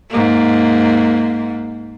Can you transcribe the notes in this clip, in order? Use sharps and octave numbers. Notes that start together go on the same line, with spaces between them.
G#2 A#3